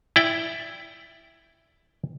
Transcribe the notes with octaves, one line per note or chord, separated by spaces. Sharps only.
E4 D5 G5